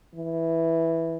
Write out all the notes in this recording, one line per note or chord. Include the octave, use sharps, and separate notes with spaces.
E3